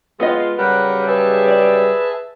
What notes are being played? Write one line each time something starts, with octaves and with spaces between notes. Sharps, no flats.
G#3 B3 F4 D#5
C#3 F#3 G3 A#4 B4 F#5
G#4 B4 E5 A5
D5